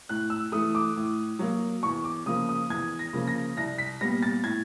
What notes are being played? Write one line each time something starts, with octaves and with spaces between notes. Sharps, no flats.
A2 F#6
E6
E3 A3 D#6
D6
A2
F#3 A#3
E2 C#6
D6
C#3 F3 A#3 D#6
D#6
E2 G#6
A#6
C#3 F3 A#3
A#6
C2 A#6
B6
A#2 G3 B3 A#6
A6
A2 G#6